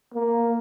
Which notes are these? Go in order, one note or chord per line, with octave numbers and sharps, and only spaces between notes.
A#3